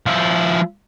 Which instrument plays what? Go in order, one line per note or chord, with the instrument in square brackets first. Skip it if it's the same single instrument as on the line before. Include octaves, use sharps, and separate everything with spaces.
[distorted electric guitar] F3 E4